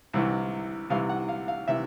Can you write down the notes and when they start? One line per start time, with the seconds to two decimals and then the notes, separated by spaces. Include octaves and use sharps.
0.14 C2 C3 E3
0.90 C2 C3 E3 F5
1.09 F#5
1.29 F5
1.48 F5
1.68 C3 E3 E5